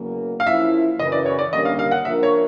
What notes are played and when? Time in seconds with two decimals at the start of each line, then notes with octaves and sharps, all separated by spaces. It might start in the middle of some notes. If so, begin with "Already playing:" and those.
Already playing: E2 C#3 F#3 A#3
0.40 F5
0.45 F3 A#3 C#4 E4 E5
0.99 F#2 C#3 E3 D#5
1.12 D5
1.26 C#5
1.39 D5
1.52 D#2 D3 G3 A#3 C#4 D#5
1.65 F5
1.79 F5
1.91 F#5
2.05 F3 A#3 D4 F4 A#4 E5
2.23 C#5